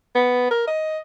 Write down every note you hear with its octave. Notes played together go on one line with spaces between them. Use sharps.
B3
A#4
D#5